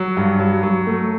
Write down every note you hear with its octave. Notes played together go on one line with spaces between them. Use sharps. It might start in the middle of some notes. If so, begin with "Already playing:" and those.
Already playing: F#3
G2
F#3
F#3
A3